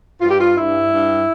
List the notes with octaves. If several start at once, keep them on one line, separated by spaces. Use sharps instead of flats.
G2 F4
G4
F4
G2 E4
G2